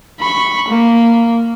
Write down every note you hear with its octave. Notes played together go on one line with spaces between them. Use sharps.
B5 C#6
A#3